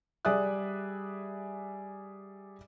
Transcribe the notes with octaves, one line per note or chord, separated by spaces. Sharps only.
G3 G#4 D5 E5 D#6 F#6